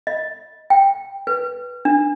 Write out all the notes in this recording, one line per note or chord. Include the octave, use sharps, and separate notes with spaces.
D#5
G5
B4
D4